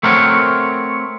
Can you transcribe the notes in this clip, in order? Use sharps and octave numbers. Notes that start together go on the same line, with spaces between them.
A3 C4 A#4 C#5 F#5